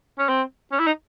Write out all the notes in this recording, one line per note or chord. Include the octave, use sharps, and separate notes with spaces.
C#4
C4
C#4
E4
D#4